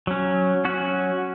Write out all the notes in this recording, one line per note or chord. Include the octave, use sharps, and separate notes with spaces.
F#3 C#4
F#3 C#4 F#4